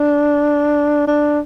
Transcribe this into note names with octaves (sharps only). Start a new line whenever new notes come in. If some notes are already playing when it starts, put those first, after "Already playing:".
Already playing: D4
D4